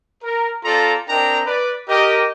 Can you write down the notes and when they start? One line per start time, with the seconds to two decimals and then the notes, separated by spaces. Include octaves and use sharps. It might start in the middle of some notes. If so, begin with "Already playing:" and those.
0.23 A#4
0.65 C4 F4 A4 D5 A5 A#5
1.09 C4 D4 A#4 D#5 G5 A#5
1.47 B4 D5
1.89 G4 A#4 D#5